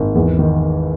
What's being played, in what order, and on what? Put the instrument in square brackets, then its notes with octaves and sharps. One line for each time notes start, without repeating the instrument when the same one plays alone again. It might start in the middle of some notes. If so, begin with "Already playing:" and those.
Already playing: [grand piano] G#1
E2
D#3